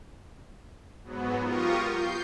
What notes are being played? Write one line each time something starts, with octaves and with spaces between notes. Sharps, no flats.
G#2 F#3 B3
F4 G4 A#4 C#6 D#6
G6 C7